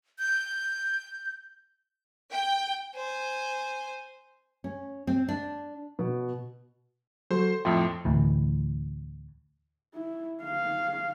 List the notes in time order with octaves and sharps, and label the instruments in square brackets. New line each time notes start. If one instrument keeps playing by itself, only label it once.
[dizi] G6
[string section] G5
[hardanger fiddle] C5 G#5
[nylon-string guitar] C#4
C4
D4
[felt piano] B2
[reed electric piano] F#3 F#4 A4 [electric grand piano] C5 C6
[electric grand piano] F2 A2 F3 [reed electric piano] E5 G5 C6
[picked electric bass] D2 A2 E3
[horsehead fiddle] E4
F5